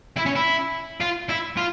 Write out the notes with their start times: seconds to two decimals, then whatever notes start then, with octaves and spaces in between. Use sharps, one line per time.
0.16 E4
0.26 C#4
0.36 E4
1.01 F4
1.29 E4
1.57 F4